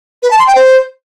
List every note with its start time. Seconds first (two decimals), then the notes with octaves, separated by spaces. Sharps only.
0.23 B4
0.31 A5
0.39 C6
0.47 G5
0.55 C5